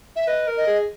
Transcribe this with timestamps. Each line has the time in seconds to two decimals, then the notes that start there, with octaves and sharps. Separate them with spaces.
0.16 E5
0.27 B4 D#5
0.47 A#4
0.57 D#5
0.67 G#4